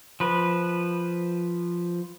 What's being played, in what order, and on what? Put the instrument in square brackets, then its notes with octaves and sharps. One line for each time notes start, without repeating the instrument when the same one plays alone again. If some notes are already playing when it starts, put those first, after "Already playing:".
[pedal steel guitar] F3 B4